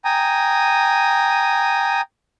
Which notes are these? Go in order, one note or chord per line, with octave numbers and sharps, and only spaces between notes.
G5 G#5 A#5 D#6